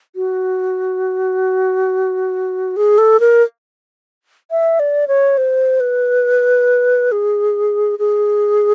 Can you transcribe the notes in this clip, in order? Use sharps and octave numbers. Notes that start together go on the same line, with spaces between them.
F#4
G#4
A4
A#4
E5
D5
C#5
C5
B4
G#4
G#4